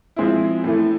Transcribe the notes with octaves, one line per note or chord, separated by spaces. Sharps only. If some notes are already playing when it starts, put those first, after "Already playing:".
F3 G#3 C4 E4
A2 E3 A3